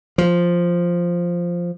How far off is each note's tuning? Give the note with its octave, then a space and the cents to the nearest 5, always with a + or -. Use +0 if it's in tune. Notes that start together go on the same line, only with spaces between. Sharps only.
F3 +0